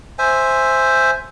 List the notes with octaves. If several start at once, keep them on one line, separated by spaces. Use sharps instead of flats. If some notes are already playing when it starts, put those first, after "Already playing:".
C5 E5 G#5